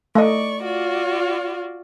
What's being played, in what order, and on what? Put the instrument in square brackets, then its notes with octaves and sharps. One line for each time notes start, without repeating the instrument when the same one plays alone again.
[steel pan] A3 D#5 [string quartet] D5 C#6
[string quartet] F4 F#4 D5